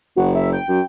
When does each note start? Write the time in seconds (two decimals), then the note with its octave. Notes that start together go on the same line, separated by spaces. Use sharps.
0.16 F#1 F#4
0.35 E5
0.53 G5
0.68 F#2 G5